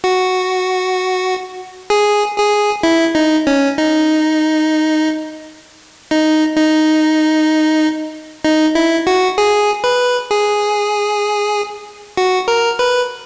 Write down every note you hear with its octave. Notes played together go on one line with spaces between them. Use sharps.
F#4
G#4
G#4
E4
D#4
C#4
D#4
D#4
D#4
D#4
E4
F#4
G#4
B4
G#4
F#4
A#4
B4